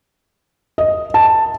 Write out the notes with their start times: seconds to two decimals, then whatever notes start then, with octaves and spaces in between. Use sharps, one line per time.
0.78 D#5
1.14 A5